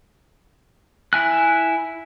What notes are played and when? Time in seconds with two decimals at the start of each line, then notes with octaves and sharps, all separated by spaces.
1.13 E4 G#5 F#6